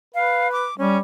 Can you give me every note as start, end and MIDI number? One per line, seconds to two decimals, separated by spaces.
0.15 0.66 71
0.15 0.50 77
0.52 0.77 86
0.78 1.00 55
0.78 0.98 61